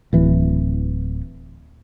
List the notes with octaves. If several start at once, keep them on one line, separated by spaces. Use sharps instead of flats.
D1 E3